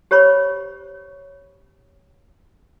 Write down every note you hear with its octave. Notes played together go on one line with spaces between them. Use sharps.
G4 C5 C#5 B5 C#6